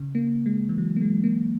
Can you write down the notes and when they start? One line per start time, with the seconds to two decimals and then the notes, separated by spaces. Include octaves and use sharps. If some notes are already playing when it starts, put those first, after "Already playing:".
Already playing: C#3
0.15 A#3
0.46 G#3
0.69 E3
0.78 F#3
0.96 A#3
1.01 G#3
1.24 A#3